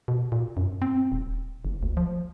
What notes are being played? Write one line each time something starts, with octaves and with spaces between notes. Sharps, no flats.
B2
A#2
F#2
C4
D#1
F#1
D2
F3